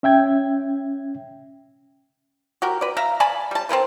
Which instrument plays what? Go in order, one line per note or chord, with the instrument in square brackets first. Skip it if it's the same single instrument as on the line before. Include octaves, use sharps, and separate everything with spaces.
[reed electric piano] C#4 E5 G5 G#6
[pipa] F#4 G4 A#4
B4 D5
E5 F5 A#5
D5 G#5 A5 B5
G3 A5
C4 E4 A#4 B4